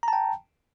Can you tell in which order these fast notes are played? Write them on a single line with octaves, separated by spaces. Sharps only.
A#5 A5 G5